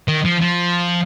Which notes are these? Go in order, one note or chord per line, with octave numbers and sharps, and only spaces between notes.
D#3
F3
F3